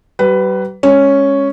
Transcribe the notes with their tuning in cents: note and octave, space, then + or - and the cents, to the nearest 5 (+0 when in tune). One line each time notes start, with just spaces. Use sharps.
G3 -40 B4 +15
G#3 +0 C#4 +0